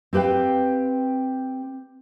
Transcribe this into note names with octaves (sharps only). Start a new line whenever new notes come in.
C4 G4 B4 F5 G5